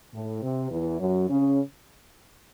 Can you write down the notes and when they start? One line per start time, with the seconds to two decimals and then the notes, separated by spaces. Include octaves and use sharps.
0.13 A2
0.42 C3
0.71 E2 E3
1.00 F#2 F#3
1.28 C#3 C#4